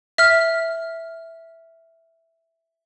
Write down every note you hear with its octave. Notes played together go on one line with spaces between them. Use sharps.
E5 F6